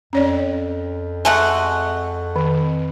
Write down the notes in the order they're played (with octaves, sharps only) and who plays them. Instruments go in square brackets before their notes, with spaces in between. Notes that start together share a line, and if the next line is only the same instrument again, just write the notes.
[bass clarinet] F2 [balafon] C#4 C#5 D5
[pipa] G#3 A3 F#4
[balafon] D#3